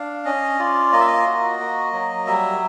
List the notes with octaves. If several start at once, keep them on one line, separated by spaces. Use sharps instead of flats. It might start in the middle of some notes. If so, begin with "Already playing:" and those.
Already playing: D4 F5
C#4 D#5
F4 D5
A#3 D#5
E5
D#5
F#4
A#3
F#3
G3 E5